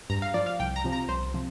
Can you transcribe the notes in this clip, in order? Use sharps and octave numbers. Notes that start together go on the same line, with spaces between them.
G2 A#5
F5
F3 D5
F5
C2 G5
A#5
C3 F3
A#5
C2 C5
C3 F3